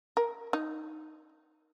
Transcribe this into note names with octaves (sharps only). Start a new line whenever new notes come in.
A#4
D#4